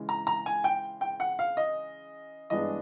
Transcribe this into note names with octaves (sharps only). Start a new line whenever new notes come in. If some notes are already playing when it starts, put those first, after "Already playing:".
Already playing: C#3 E3 G#3
A#5
A#5
G#5
G5
G5
F#5
F5
D#5
G2 E3 G#3 B3 D4 D#5